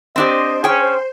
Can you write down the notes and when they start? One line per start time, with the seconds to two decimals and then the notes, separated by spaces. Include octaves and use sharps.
0.16 C4 D4 G4 C5 D#5
0.64 C#4 G#4 G5